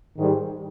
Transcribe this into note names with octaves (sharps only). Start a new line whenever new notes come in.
G#2 D#3 G3